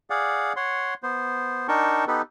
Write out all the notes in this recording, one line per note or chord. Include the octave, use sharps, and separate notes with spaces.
G#4 D5 F5 F#5
C#5 F#5 C6
B3 C5
D4 D#4 A#4 G5 A5 C#6
B3 D#4 G4 A4 B4